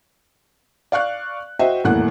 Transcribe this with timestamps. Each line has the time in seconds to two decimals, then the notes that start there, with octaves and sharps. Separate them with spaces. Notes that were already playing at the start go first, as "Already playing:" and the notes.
0.92 D5 F5 C#6 F#6
1.59 F#4 C5 D#5 E5 G5
1.84 D#1 E2 A2 A#3 F#5 F#6